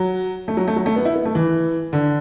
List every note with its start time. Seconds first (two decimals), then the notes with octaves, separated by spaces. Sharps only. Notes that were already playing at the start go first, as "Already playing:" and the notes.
Already playing: F#3
0.48 A3
0.57 F#3
0.68 A3
0.76 F#3
0.86 A3
0.96 B3
1.05 E4
1.16 B3
1.25 A3
1.35 E3
1.93 D3